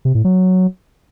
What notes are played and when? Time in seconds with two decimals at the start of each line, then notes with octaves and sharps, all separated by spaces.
0.05 C3
0.15 A2
0.24 F#3